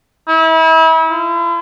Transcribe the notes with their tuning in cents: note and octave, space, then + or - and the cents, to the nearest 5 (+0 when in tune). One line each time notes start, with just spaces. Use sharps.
E4 -35
E4 +45